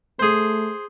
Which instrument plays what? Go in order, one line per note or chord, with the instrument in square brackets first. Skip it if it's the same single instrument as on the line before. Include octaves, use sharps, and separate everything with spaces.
[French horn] A3 [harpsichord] G#4 C5